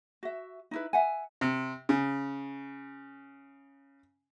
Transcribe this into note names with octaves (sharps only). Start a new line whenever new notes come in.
F#4 E5
D#4 E4 B4
E5 F#5 G#5
C3
C#3